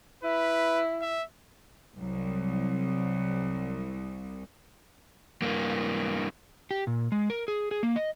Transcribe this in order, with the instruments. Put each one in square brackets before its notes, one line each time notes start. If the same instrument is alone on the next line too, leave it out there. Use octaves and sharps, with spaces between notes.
[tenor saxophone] E4 [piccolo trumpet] B4
[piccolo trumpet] E5
[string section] C2 [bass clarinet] F#3
[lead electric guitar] G2 A#3
[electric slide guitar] G4
A#2
G#3
A#4
G#4
G#4
A#3
D#5